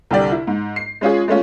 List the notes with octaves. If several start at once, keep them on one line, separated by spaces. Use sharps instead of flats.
C2 D3 G4 D5
E4
G#2
C7
G#3 C#4 F4 G#4
G#3 A3 C#4 F4